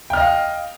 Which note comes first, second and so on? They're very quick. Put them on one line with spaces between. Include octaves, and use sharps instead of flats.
G5 F6 D#5 F5